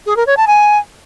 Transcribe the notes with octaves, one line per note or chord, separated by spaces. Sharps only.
G#4
A#4
C#5
A5
G#5